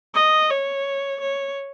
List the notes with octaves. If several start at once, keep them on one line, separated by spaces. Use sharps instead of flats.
D#5
C#5
C#5